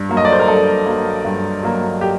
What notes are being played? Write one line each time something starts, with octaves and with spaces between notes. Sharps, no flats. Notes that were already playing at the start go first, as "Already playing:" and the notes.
Already playing: G2
F#3 A#3
D#5
D5
C5
A#4
G2 A4
F#3 A#3
G2
F#3 A#3
G4